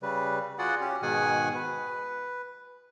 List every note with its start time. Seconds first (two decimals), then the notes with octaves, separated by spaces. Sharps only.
0.03 C#3 G3 B4
0.59 F4 F#4 G#4 D5 F#5
0.81 C#4 G4
1.02 G#2 B2 D#3 G#4 F#5 G#5
1.55 B4